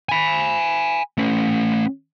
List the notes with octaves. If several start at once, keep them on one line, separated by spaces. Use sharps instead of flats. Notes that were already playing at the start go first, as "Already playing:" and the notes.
G#5 B5
A3 C#4